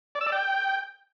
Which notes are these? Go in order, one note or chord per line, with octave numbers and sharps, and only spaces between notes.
D5
E6
D5
G5